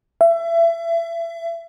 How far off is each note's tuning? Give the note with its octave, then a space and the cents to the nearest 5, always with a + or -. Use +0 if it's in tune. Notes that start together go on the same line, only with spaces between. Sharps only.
E5 +30